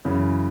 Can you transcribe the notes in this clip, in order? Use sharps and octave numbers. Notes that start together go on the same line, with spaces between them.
F#2 C#3 E3